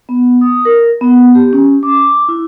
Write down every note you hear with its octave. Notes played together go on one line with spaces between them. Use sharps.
B3
D#6
A#4
B3
G4
C#4
D6
E4